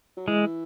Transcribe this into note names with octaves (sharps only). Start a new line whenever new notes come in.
F#3
E3 G#3